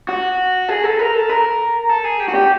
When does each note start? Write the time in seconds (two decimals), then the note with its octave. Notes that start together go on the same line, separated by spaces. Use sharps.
0.09 F#4
0.69 G#4
0.84 A4
0.99 A#4
1.14 A4
1.29 A#4
1.89 A4
2.04 G#4
2.20 G4
2.28 F#4
2.35 G4